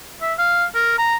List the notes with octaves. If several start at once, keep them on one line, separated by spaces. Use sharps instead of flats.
E5
F5
A#4
A#5